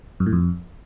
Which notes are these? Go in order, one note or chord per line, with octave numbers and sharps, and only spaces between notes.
F#2
A2
F2